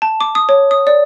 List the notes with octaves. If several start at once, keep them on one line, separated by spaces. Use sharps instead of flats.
A5
D6
D#6
C#5
D#6
D5